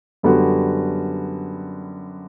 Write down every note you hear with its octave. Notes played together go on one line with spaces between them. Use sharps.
F#2 D3 G3 B3 F#4